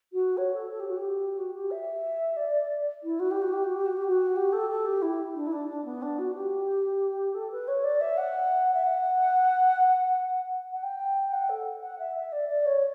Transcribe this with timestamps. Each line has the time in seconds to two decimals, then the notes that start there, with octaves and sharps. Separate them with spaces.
0.13 F#4
0.37 C#5
0.54 A4
0.71 A4
0.80 G4
0.88 F#4
0.96 G4
1.37 F#4
1.54 G4
1.71 E5
2.37 D5
3.03 E4
3.20 F#4
3.31 G4
3.42 F#4
3.53 G4
3.64 F#4
3.75 G4
3.86 F#4
3.97 G4
4.08 F#4
4.36 G4
4.53 A4
4.69 A4
4.86 G4
5.02 E4
5.35 D4
5.47 E4
5.52 D4
5.69 D4
5.85 B3
6.02 D4
6.19 F#4
6.35 G4
7.34 A4
7.51 B4
7.68 C#5
7.84 D5
8.01 E5
8.17 F#5
8.74 E5
8.84 F#5
10.72 F#5
10.83 G5
11.33 F#5
11.49 A4
11.82 F#5
11.99 E5
12.16 E5
12.32 D5
12.49 D5
12.66 C#5